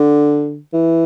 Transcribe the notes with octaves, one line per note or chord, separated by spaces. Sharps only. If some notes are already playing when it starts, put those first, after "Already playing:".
Already playing: D3
E3